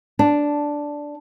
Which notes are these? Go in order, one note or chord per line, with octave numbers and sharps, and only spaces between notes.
D4